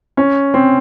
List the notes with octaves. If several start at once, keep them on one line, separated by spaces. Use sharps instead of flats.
C#4
C4